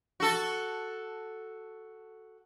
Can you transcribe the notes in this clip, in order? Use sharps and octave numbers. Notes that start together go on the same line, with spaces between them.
F#4 A4